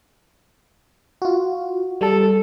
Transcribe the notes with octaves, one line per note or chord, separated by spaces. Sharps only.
F4 F#4
G3 A4 A5